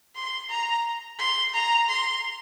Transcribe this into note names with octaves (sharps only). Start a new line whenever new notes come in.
C6
A#5
C6
A#5
C6